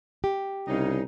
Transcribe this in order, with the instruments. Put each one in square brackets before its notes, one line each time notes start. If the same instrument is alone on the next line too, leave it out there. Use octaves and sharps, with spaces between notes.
[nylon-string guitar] G4
[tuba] C2 [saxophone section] C#3 D#4